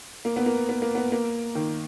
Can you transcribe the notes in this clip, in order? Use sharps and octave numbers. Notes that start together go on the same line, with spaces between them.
A#3
B3
A#3
B3
A#3
B3
A#3
D#3